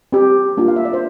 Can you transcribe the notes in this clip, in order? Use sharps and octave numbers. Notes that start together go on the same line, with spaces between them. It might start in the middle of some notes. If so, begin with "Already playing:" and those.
C4 G4
A#3 D4 F4
F5
E5
D5
C5